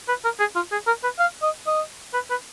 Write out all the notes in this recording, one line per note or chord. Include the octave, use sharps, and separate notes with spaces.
B4
A#4
G#4
F4
G#4
A#4
B4
F5
D#5
D#5
B4
B4